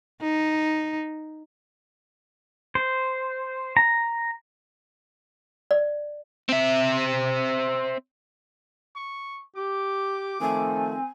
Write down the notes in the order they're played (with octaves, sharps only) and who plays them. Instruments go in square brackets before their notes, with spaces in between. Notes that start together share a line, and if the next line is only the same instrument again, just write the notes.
[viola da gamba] D#4
[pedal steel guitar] C5
A#5
[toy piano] D5
[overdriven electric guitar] C4 E5
[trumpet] C#6
[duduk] G4 [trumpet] D6
[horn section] D#3 F3 A3 [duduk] C4 [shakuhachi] G#5